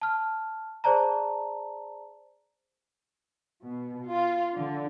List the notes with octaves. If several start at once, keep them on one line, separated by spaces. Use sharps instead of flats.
A5 F6
G#4 C5 D5 A5 A#5
B2
F4
D3